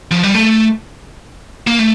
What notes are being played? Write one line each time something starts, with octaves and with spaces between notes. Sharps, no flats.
F3
G3
A3
A#3
A3